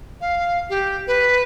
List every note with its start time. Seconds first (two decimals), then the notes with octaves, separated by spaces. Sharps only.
0.21 F5
0.70 G4
1.07 B4